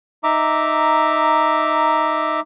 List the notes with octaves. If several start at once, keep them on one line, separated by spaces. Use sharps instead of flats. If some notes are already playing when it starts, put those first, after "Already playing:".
D#4 E5 A#5 D6